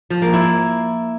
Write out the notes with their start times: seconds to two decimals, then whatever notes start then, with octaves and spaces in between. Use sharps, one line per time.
0.10 F3
0.22 A#3
0.34 E4